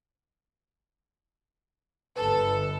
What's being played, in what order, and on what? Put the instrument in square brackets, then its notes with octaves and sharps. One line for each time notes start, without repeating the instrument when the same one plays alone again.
[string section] G1 A4 [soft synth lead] B4